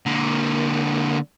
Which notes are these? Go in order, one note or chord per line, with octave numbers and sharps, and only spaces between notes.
D3 A#3